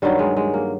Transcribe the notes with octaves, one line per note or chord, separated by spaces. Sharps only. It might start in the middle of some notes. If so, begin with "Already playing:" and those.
G2 D#3 F#3 G3
G#3
G#3
A#3